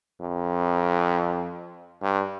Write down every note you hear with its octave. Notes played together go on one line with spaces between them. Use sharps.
F2
G2